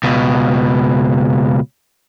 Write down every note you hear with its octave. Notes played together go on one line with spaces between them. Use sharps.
C#2 B2